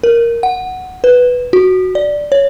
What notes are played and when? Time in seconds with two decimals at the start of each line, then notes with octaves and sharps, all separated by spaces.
0.03 A#4
0.43 F#5
1.04 B4
1.53 F#4
1.95 D5
2.32 C#5